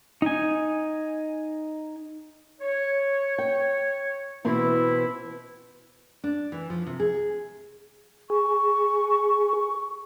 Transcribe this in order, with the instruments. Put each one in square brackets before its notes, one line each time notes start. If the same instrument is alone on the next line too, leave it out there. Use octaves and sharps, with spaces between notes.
[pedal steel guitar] D#4 G#5
[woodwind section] C#5
[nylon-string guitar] G5
[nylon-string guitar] B2 E3 C4 [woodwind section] E4
[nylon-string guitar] D4
E3
F3
C3
G#4
[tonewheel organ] G#4 [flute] C#6